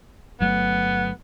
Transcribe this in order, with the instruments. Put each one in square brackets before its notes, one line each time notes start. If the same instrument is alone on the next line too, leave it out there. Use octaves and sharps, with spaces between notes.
[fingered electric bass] G1 F#3 A3 [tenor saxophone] B3